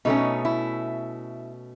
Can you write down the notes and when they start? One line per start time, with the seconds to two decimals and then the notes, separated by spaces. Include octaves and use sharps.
0.05 B2 A3 C#4 D#4
0.45 E4